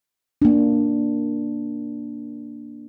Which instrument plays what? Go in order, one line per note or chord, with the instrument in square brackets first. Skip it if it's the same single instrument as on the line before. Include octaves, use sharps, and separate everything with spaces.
[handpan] A#3 D4